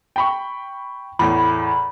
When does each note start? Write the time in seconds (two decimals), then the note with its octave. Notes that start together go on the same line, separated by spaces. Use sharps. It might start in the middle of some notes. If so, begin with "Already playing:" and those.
0.16 G5 B5 C#6
1.19 E2 A2 B5